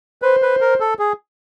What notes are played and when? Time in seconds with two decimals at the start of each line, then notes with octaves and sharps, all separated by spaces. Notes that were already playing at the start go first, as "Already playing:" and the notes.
0.22 B4 C5
0.42 B4
0.61 A#4
0.80 A4
0.99 G#4